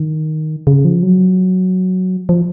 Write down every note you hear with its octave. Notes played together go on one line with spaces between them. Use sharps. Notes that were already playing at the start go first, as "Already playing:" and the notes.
Already playing: D#3
C#3
F3
F#3
F3